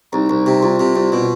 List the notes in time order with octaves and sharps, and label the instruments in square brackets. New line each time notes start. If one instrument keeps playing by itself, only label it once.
[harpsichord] C2 [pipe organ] D#4
[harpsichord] C2
C3
[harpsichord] C2 [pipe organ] F4
[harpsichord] C3
C2
B2